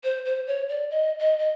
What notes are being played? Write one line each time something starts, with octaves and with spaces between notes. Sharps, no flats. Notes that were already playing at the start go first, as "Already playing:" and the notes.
C5
C5
C#5
D5
D#5
D#5
D#5